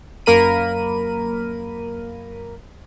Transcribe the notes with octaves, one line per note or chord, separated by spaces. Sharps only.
F#2 A#3 A#4 B5 D#7